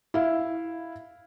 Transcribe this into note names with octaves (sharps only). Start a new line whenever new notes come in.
E4 F5